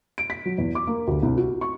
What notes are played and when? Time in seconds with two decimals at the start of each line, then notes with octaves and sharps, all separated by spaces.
0.18 D7
0.30 B6
0.45 F#3
0.58 E2
0.75 D6
0.87 A#3
1.07 D2
1.22 C2
1.38 F#4
1.61 C#6